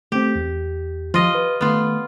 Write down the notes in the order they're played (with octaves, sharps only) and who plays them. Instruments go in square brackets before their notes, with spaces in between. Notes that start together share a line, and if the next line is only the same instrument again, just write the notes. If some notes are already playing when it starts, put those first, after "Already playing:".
[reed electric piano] A3 C4 [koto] G4
[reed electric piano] E2
[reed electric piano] F3 [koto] F4 D#5
[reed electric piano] B4
[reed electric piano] D#3 A3 [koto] B3 F4